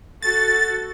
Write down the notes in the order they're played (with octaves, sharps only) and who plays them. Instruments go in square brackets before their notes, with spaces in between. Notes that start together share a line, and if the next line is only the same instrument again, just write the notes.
[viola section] F#4 A4 [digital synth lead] A6